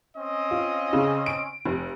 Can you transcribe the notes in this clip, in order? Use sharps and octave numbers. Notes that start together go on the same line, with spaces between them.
C4 C#4 D#5
F4
C#3
D7
F1